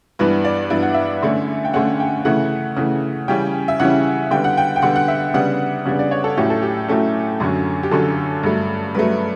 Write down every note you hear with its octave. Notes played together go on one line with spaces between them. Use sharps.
G2 E3 B3 D4 B4
D5
G2 E3 B3 D4 E5
F#5
E5
D3 A3 C#4
G5
D3 A3 C#4 F#5
G5
C#3 E3 A3 F#5
C#3 E3 A3
C#3 E3 G3 C#4 G5
E5
C#3 E3 G3 C#4 F#5
D3 G3 B3 G5
F#5
G5
G5
D3 G3 B3 F#5
F#5
E5
C#3 G3 B3 D4 F#5
C#3 G3 B3 D4
D5
C#5
A4
A2 F#3 A3 C#4 G4
A4
G4
A2 F#3 A3 C#4
F#2 D3 F#3 C#4
G4
F#2 D3 F#3 C#4 A4
G2 F#3 A3
G2 F#3 A3 B4